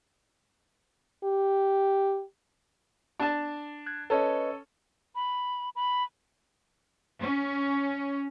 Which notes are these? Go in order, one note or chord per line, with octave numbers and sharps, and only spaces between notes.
G4
D4 A5
F#6 G#6
C#4 A4 B4 C#5 D#5
B5
B5
C#4